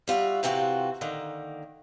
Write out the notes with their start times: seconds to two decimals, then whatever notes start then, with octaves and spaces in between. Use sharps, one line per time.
0.08 G3 F4 F#4 E5
0.43 C3 E3 C4 F4 F#4
1.01 D3 D#3 A#3